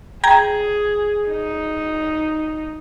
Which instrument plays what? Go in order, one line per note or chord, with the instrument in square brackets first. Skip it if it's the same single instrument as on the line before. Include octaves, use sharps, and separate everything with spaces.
[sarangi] G#4 [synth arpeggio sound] G5 A#5 G#6
[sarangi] D#4